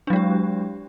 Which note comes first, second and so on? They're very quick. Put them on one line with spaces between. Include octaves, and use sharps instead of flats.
D4 F#3 G#3 G4